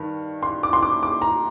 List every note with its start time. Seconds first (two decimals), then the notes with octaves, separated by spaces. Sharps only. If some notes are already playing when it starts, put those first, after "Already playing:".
Already playing: G2 D#3
0.43 C6
0.63 D6
0.73 C6
0.83 D6
1.03 D6
1.22 A#5